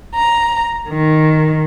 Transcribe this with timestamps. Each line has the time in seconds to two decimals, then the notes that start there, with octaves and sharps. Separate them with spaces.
0.14 A#5
0.89 D#3